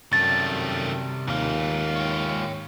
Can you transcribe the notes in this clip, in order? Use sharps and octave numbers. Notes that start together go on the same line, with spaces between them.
F#2 C3 D#3 G3 A4 A6
D#2 G#2 F4
C#5 G5